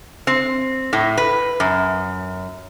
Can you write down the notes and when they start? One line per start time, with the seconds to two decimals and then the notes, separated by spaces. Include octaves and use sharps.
0.27 C4
0.93 A2
1.17 B4
1.60 F#2